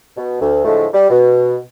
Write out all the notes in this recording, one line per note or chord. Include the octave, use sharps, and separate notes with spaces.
B2
D2
A2 D3 F3 G#3 A3
G3
B2